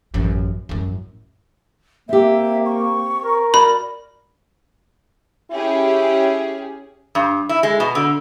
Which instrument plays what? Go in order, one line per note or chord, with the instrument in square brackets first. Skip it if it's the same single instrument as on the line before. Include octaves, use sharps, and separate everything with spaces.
[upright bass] A1 F#2
A1 F#2
[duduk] A#3 [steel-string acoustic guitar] C4 G4 [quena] E5
[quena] C#6
[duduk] A#4
[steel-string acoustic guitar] F#4 D5 [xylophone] B5
[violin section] C#4 G4 G#4 [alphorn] E4
[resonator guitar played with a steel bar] G2
E4
G#3
B2
D3